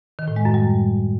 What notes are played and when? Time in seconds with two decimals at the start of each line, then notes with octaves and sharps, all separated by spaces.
0.19 D#3
0.28 A2
0.36 G#3
0.45 F#2
0.54 G3